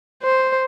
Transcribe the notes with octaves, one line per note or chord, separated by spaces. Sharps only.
C5